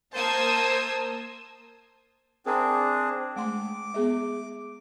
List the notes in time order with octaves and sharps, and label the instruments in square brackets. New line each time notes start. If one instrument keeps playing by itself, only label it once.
[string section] A#3 A#4 A5 [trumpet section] C5 [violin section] D#6 E6 G#6
[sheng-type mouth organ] C4 D4 G#4 [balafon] A#4 E5 A#5
[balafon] G#3 A3 C6 [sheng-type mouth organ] D6
[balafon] B3 G#4 E5